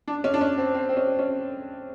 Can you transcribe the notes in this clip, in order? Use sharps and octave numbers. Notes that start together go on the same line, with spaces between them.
D4
C#4
D4
C#4
C4
C4
C4
C#4
C#4